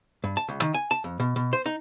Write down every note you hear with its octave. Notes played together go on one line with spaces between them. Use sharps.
G2
A5
C#2
D#3
G#5
A5
F2
B2
B2
C5
D#4